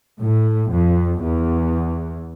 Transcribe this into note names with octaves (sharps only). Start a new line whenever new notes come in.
A2
F2
E2